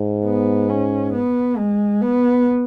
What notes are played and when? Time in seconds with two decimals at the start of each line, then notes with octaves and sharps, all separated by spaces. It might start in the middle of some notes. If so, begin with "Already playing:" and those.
Already playing: G#2
0.25 B3
0.69 C#4
1.13 B3
1.57 G#3
2.01 B3